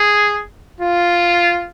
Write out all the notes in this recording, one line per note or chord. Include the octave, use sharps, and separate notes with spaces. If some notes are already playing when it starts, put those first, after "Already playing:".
Already playing: G#4
F4